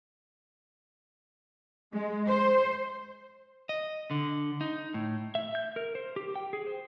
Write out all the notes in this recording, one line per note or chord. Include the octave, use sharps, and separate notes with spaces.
G#3
C5
D#5
D3
D#4
A2
E5
G6
A#4
C5
G4
G5
G#4
C5